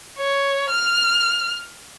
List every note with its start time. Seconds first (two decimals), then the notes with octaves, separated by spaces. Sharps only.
0.18 C#5
0.69 F6